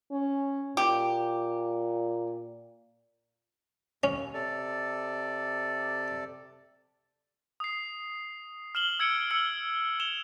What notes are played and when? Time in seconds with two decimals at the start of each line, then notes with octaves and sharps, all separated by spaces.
0.12 C#4
0.77 A#2 G4
4.04 D#2 C#4
4.34 C3 A4 D5
7.60 D#6 C7
8.75 F6 E7 F#7 G7
8.99 E6 G#6 C#7 D7
9.30 E6 F6 C#7 F#7 G7
10.00 E7 F7 G7